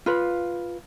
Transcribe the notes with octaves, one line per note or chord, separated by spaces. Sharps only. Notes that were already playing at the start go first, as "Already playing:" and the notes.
F4 B4